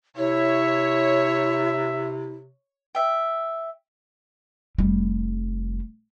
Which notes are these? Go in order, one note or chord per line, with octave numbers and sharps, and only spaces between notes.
C3 E4 C#5 E5
E5 G5
F1 G3